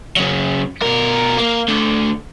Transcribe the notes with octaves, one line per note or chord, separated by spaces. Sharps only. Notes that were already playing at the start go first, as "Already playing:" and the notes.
C#3 F#3
B2 A#4
A#3
D2 D3